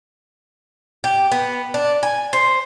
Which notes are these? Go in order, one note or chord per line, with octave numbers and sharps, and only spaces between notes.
G4
B3
D4
G#5
C5